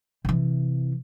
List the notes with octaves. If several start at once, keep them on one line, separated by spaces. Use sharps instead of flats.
C3 E3